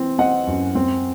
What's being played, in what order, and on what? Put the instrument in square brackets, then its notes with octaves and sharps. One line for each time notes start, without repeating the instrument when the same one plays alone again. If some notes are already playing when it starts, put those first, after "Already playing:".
Already playing: [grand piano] E3 C4
C4 D#5 F#5
F#2
C4